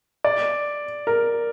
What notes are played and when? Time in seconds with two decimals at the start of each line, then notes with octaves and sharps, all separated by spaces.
0.24 D5
1.07 A#4